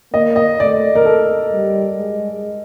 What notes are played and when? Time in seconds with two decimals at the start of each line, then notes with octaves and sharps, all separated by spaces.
0.13 A#3 D#5
0.36 D#5
0.60 A3 D5
0.95 A#4
1.05 A4
1.52 G3
1.98 G#3